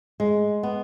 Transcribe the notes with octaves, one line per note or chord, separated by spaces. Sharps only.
G#3
B3